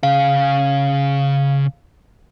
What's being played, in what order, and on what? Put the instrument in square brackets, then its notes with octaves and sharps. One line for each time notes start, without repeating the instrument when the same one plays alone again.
[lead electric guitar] C#3 G#4 [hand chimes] F5